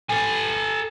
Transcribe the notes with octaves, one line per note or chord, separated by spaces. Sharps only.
A4 G#5